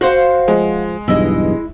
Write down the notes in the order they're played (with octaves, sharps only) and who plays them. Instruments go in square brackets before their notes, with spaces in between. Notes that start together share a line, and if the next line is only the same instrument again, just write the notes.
[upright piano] F#4 [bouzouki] C5 F5 F#5
[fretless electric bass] F3 [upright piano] G#3
[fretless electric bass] B1 E2 G2 [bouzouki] E4 D#5